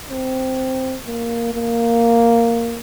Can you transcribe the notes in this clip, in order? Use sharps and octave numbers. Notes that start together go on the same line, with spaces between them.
C4
A#3
A#3